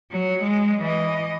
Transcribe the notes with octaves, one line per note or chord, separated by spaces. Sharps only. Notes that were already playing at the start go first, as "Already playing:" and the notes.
F#3
G#3
E3 D#5